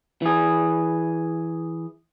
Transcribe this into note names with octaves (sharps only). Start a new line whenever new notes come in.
E3 G#4